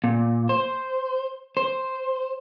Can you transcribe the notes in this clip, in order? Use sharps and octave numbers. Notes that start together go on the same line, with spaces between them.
A#2
C5
C5